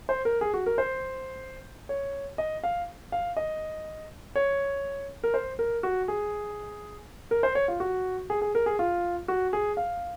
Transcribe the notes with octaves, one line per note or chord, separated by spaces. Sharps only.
C5
A#4
G#4
F#4
A#4
C5
C#5
D#5
F5
F5
D#5
C#5
A#4
C5
A#4
F#4
G#4
A#4
C5
C#5
F4
F#4
G#4
G#4
A#4
G#4
F4
F#4
G#4
F5